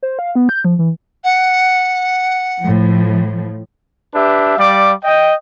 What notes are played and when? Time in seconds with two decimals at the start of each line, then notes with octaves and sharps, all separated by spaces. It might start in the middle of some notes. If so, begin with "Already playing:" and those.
0.03 C5
0.19 F5
0.35 B3
0.49 G6
0.65 F3
0.79 E3
1.24 F#5
2.63 A2 F3
4.14 D4 G4 B4 E5
4.57 G3 D5 F5 D6
5.04 D#5 G5